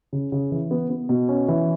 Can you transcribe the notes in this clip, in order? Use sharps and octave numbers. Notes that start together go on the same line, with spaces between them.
C#3
C#3
E3
B3
B3
B2
C#4
E3